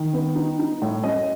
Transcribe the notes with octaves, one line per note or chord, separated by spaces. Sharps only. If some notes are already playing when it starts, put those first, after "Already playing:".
Already playing: D#3
B3
D#4
D#4
A2
F#2 D#5